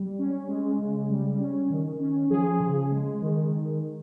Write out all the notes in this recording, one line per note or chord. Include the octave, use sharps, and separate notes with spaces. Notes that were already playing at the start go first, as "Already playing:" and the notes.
Already playing: G3
C#4
G#3
C#3
G3
C#4
D#3
C#4
F3 G#4
C#3
G#3
D#3